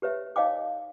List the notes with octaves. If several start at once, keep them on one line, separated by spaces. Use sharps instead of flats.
G4 B4 C#5 E5
D#4 C#5 D#5 F5 G5 D6